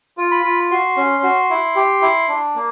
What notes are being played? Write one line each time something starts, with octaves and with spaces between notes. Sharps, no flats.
F4
B5
F4
F#4 C6
C#4
F#4
E4
G4
E4
D4
A#3